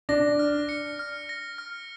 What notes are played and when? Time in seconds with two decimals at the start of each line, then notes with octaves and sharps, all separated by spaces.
0.09 D4 A#6
0.39 F6
0.69 C#7
0.99 F6
1.29 A#6
1.58 F6